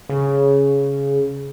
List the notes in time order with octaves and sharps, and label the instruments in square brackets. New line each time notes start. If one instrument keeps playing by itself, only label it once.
[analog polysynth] C#3